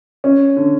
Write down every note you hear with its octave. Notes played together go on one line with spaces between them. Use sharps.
C#4
D3